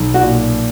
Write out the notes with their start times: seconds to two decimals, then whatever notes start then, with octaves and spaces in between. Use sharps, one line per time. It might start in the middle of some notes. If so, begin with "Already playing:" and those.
Already playing: B1
0.14 F#4
0.22 A#2